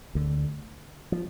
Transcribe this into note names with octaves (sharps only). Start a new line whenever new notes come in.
D2 D3
F3